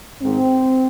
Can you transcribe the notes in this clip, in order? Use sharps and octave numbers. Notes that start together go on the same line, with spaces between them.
G#2 D#3 G#3 C4